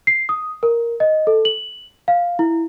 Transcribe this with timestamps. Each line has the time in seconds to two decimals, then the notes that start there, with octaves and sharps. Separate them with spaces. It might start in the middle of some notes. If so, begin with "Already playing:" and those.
0.07 C7
0.29 D#6
0.63 A#4
1.00 D#5
1.27 A4
1.45 F#7
2.08 F5
2.39 E4